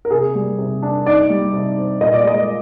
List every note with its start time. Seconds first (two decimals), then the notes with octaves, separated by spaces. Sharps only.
0.05 A#4
0.11 C3 G#4
0.35 G3
0.58 C3
0.83 D4
1.06 D#4 D5
1.30 G3
1.53 C3
1.77 C4
2.01 A#2 D#5
2.14 D5
2.24 G#3 D#5